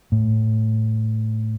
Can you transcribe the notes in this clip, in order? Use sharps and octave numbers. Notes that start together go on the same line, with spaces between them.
A2